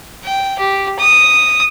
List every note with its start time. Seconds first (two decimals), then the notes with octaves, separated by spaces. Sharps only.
0.24 G5
0.59 G4
0.99 D#6